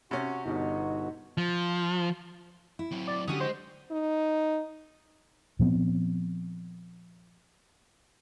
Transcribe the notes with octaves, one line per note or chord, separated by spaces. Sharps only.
C3 C#4 F#4
G1 B2 D#4 F#4
F3
E4
F#3 C4
D5
D3 F#3 C#4 G4 D#6
G#3 C5 D#5
D#4
A#2 F3 B3 C4